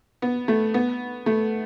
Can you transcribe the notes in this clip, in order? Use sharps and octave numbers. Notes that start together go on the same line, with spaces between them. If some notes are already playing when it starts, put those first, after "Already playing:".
B3
A3
B3
A3